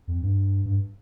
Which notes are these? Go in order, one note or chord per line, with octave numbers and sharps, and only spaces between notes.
F2
G2
G2